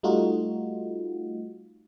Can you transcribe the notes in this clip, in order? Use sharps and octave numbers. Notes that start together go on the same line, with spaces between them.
G3 A3 D#4 F4 F#4